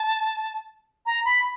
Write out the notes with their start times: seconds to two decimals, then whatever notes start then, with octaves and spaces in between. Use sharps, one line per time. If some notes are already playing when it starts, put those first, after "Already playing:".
Already playing: A5
1.06 A#5
1.25 B5